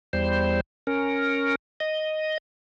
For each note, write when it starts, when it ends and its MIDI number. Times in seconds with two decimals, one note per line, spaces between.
0.13 0.61 40
0.13 0.61 55
0.13 0.61 72
0.87 1.55 61
0.87 1.55 70
1.80 2.38 75